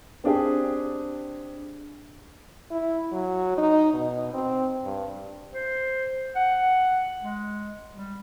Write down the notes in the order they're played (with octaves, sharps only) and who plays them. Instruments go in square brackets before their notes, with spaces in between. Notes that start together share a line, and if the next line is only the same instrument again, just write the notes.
[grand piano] C4 D4 G4 G#4
[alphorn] E4
F#3
D#4
B2
C4
G2
[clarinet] C5
F#5
G#3
G3